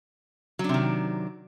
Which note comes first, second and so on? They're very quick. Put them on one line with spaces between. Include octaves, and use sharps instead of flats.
F#3 D4 C3 D#3